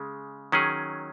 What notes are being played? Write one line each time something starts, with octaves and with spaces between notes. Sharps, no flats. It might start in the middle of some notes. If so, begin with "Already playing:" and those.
Already playing: C#3 G#3
D#3 F#3 C#4 G#4